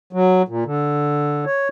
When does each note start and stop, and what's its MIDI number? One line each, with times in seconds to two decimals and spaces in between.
0.13 0.42 54
0.48 0.64 46
0.65 1.45 50
1.46 1.68 73